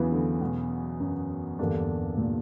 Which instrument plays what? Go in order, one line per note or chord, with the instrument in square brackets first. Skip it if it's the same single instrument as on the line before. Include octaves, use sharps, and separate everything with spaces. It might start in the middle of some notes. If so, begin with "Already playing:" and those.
Already playing: [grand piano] E2 C#3 F#3 B3 [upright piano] E3
[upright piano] D3
B2
F#2
[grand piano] E2 D3 A#3 D4 [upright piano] G2
[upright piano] A#2